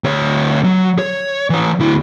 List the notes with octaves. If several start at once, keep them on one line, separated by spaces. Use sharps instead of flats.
D2 C#5
F#3
C#5
E3 C#5
D2 E4